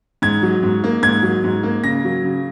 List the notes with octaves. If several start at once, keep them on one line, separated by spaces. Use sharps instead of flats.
G#2 G#6
F#3
G#2
A#3
G#2 G#6
F#3
G#2
A#3
C#3 A#6
F#3
C#3